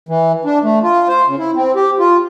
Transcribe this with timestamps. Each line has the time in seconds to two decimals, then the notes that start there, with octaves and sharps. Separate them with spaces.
0.09 E3
0.45 D4
0.63 A3
0.83 F4
1.08 C5
1.27 C#3
1.39 E4
1.56 C4
1.76 G4
1.99 F4